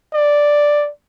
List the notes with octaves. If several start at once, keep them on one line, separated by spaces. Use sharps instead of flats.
D5